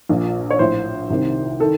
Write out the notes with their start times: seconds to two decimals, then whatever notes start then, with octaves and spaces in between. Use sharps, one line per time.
0.09 A#1 A#2
0.50 C#5
0.59 A#1 A2 C5
1.10 C2 C3 D#3
1.60 D#3 A4